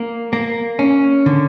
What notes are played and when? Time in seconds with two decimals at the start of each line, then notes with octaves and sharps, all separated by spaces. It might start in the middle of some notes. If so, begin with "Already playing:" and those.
Already playing: A#3
0.33 A#3
0.79 C#4
1.26 D3